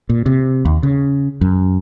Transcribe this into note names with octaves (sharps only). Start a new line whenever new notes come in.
A#2
C3
D#2
C#3
F#2